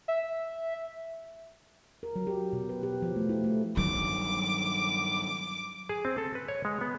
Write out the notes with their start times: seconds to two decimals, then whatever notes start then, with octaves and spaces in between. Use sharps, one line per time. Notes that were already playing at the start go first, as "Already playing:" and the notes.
0.08 E5
2.03 A#4
2.16 F#3
2.27 G4
2.53 B2
2.69 B4
2.83 G4
3.02 F3
3.16 A3
3.29 E4
3.44 A3
3.77 G2 D#3 F#3 D6
5.89 G#4
6.05 C4
6.18 A4
6.35 B4
6.48 C#5
6.65 G#3
6.81 B3